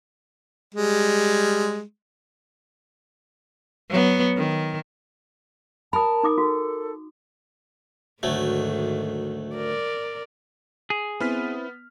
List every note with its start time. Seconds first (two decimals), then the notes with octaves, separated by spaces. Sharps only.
0.75 G3 G#3
3.90 F#3 B3
4.37 D#3
5.93 A#4 A5 B5 D#6
6.23 D#4 D6 D#6
6.38 F#4 A4
8.23 D2 G#2 D#3 F#3 A3
9.56 A#4 D5
10.90 G#4
11.20 B3 C4 E4 F6 B6